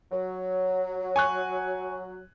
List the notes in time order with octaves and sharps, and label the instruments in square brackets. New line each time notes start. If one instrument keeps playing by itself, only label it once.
[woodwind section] F#3
[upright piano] G#5 C#6 F#6